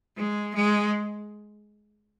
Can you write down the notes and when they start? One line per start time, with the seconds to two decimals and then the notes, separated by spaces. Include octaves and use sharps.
0.17 G#3
0.55 G#3